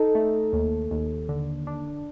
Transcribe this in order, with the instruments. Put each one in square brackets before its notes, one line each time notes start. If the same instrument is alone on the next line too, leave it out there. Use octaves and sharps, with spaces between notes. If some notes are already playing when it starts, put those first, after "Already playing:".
Already playing: [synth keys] D#4 [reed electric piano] A4
[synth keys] A3
D#2
D#2
D3
D4